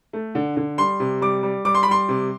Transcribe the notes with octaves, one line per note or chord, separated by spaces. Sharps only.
A3
D3
D3
G3 C6
C3
G3 D6
G3
G3 D6
C6
B5
G3 C6
C3